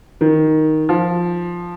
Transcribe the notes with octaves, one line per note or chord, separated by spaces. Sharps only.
D#3
F3